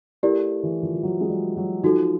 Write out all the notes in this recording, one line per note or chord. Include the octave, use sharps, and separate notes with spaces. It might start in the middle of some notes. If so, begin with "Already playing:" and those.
A3 E4 G4 A#4 D5
E3
F3
F3
F#3
G#3
G3
F#3
F3 D#4 F#4 A4